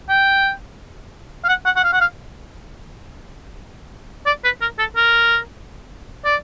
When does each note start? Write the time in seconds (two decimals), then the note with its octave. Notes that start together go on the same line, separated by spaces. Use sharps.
0.09 G5
1.44 F5
1.48 F#5
1.65 F#5
1.76 F#5
1.84 F5
1.93 F#5
2.01 F5
4.26 D5
4.44 B4
4.61 A#4
4.79 A4
4.96 A#4
6.25 D5